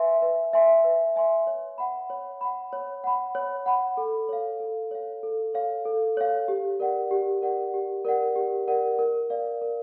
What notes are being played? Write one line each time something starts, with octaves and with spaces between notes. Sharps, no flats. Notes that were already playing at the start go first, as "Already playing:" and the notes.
Already playing: B4 E5 G#5 C6
B4
E5 G#5 C6
B4
E5 G#5 C6
C#5
F#5 B5
C#5
F#5 B5
C#5
F#5 B5
C#5
F#5 B5
A4
C#5 F5
A4
C#5 F5
A4
C#5 F5
A4
C#5 F5
G4
A#4 D5 F#5
G4
A#4 D5 F#5
G4
A#4 D5 F#5
G4
A#4 D5 F#5
A#4
D5 F5
A#4